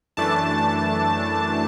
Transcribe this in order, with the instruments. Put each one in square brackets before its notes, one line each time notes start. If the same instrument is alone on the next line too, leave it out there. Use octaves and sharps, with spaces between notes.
[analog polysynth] F#2 E3 A3 D4 A5